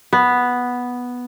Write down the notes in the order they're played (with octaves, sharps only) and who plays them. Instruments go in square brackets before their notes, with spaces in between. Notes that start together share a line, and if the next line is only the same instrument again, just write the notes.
[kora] B3